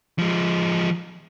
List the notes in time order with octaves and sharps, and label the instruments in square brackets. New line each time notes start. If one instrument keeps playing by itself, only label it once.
[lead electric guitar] F3 G#3